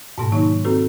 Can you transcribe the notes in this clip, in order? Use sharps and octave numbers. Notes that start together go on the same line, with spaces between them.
G#2 B2 A#3
D#3 F#3 D#4
C4 F#4 A4 B4